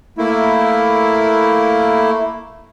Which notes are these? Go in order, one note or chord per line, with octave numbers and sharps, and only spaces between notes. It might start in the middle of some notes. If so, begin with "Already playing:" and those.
A3 A#3 E4